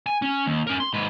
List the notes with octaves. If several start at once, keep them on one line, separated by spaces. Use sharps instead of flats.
G#5
C#4
D#2
C#4 A#4
C6
G#2 B4